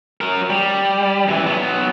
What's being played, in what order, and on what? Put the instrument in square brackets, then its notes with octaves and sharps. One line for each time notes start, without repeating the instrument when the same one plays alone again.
[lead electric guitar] F#3 A#4
G3
F#2 E3
F#3 B3